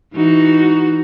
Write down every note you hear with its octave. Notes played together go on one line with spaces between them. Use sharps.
E3 D#4 F#4